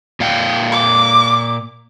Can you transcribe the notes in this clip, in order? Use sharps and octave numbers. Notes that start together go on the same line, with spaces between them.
A#2 F5 G5
D6